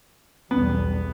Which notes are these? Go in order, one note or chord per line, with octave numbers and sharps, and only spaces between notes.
B1 E2 G3 B3